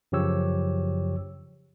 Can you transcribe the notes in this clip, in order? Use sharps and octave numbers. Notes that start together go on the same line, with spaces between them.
F#2 C#3 F3 G4 C#5 E6